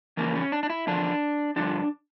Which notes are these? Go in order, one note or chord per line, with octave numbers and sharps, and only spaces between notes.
F2 C#3 E3 A#3
C#4
D4
D4
E4
E2 D3 F3 D4
G2 D3 F3 D4